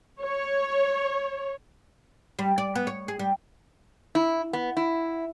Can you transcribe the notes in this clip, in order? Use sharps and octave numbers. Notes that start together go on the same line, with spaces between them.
C#5
G3
D5
B3
C#5
G#4
G3
E4
B3
E4